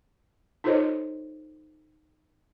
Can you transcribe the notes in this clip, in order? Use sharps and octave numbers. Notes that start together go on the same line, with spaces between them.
D#4 F4 A4 C5 C#5 D#5